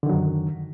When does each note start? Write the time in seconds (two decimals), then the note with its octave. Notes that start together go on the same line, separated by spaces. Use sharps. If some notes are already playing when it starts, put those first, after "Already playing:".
0.03 D3
0.06 D#3
0.09 F#3
0.13 F#2